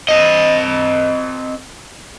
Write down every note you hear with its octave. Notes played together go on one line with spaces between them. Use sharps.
C4 D#5